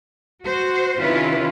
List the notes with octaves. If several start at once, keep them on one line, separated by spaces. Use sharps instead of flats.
F#4 C5
C3 D#3 C#4 E4 F4 B4